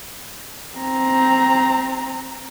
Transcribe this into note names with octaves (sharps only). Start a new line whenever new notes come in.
C4 A#5